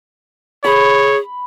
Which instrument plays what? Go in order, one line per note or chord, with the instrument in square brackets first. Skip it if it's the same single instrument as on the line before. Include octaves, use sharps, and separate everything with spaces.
[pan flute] G#4 [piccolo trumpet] C#5 [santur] B5